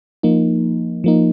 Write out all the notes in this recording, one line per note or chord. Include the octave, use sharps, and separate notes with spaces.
F3 A#3 D#4
F3 A#3 D#4